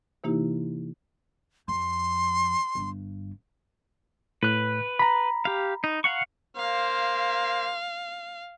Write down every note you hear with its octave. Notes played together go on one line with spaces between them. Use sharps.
C3 E3 A#3 D#4 E4 G4
F2 C6
G1 G2
A2 B4 F#6
A#5 B5
G4 F5
D#4
F5 F#5 C#6
A#3 C5 F5